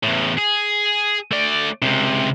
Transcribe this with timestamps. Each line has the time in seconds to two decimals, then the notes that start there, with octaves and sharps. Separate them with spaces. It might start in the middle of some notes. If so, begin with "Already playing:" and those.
0.04 E2 A2
0.39 G#4
1.31 A3 D5
1.82 C#2 C3